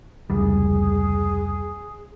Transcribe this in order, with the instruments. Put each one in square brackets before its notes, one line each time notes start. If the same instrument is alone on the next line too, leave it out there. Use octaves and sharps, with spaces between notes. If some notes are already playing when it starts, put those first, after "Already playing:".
[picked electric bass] F1 C#2 G3 [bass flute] G#4